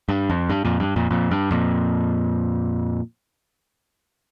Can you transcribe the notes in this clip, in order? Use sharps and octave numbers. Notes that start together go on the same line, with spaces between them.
G2
F2
G2
F2 A#2
G2
F2 A#2
F2 A#2
G2
F2 A#2